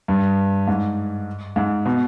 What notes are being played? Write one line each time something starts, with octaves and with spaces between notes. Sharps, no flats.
G2
G#2
G#2
B2